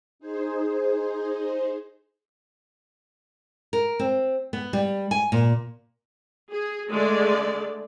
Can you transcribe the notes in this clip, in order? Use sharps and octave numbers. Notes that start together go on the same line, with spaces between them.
D#4 G#4 C5
A#4
C4
B3
G3
G#5
A#2
G#4
D3 G#3 A3 D5